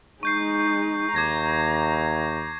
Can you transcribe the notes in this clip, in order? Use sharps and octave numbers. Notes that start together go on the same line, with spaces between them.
G#3 D#4 C#6 G6 C7
D#2 A#5 D6 G#6 A#6